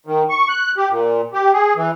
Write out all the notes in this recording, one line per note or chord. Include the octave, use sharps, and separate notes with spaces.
D#3
C#6
F#6
G4
A#2
G4
G#4
E3